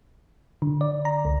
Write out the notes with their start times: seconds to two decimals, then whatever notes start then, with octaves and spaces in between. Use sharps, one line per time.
0.62 D3
0.81 D5
1.05 A#5
1.25 C#2